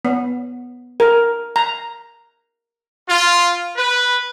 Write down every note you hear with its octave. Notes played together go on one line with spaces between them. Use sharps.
B3
A#4
A#5
F4
B4